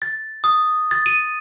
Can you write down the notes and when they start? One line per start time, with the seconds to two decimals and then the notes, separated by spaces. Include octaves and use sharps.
0.02 A6
0.44 D#6
0.91 A6
1.06 D#7